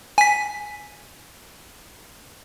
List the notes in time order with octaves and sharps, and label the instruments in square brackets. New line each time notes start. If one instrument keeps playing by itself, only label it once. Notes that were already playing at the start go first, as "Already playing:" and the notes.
[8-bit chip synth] G#5 B6